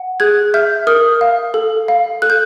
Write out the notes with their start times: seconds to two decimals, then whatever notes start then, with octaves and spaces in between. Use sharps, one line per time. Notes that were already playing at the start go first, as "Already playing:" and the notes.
Already playing: F#5
0.20 G#4 F#6 G#6
0.54 E5 F6 G6
0.87 A#4 D#6 F6
1.21 F5
1.54 A4
1.88 F5
2.22 A4 F#6
2.30 G6